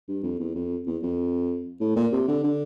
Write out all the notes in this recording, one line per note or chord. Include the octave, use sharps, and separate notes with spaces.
G2
F2
E2
F2
E2
F2
A2
A#2
C3
D3
D3